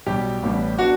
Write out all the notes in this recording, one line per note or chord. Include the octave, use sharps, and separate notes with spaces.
B1 B2 G3 G4
A1 A2 G3 B3
F#3 B3 D4 F#4